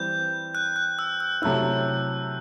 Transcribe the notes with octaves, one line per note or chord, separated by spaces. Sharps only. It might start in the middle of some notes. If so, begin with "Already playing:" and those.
Already playing: E3 G3 C4 G4 G6
F#6
F#6
E6
E6
C3 F#3 A3 E4 E6